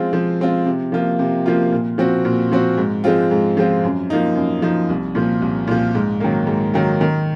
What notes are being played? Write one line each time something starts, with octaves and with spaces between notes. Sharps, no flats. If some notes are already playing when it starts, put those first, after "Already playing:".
Already playing: F3 G#3 C4 F4
F3
G#3 C4 F4
C3
F3 A#3 F4
C3
F3 A#3 F4
A#2
F3 C4 F#4
A#2
F3 C4 F#4
G#2
F3 G#3 C4 F4
G#2
F3 G#3 C4 F4
F#2
F3 A#3 D#4
F#2
F3 A#3 D#4
C2
A#2 F3
C2
A#2 F3
G#2
D#3 F#3 A#3
G#2
D#3 F#3 A#3
D#3